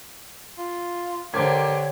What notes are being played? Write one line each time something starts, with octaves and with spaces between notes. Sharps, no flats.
F4
D3 G4 A#4 C5 C#5 D6 G#6